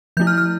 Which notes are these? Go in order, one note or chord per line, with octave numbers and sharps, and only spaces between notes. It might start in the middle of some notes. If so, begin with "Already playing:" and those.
F3 A3 E4 G6
F6
F6